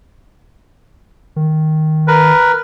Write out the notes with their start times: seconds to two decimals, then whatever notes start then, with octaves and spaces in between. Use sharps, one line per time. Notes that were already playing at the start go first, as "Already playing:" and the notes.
1.36 D#3
2.08 A#4 B4